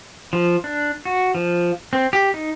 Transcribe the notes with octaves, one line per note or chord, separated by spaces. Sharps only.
F3
D4
F#4
F3
C4
G4
D#4